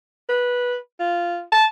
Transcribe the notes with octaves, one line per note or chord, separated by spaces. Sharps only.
B4
F4
A5